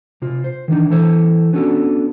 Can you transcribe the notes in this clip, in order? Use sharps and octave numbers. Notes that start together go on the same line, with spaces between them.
C3 F4
C5
D#3 E3 D4 D#4
E3 E4 A4 C5 C#5
B3 C#4 D4 F#4 A4